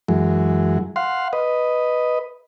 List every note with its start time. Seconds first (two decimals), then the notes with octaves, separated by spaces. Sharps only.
0.08 F#2 E3 F#3 G#3
0.96 F5 F#5 C6
1.33 B4 D#5